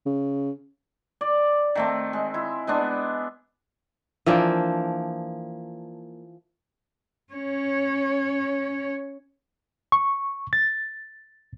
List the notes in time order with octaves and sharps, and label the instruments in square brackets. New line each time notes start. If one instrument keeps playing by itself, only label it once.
[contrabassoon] C#3
[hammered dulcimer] D5
D#3 A3 C4
G#3
E4
G#3 B3 D4
[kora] E3 F3 A#3 D4
[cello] C#4 C#5
[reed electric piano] C#6
A6